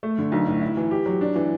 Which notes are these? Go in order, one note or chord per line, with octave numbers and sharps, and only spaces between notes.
A3
D3
B1
A2
E4
E3
G4
F#3
D4
E3